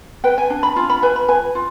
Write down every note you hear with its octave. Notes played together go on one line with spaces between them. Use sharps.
B4 G5
G#5
D4 G#5
B5
F4 G#5
B5
B4 G#5
B5
B4 G#5
F4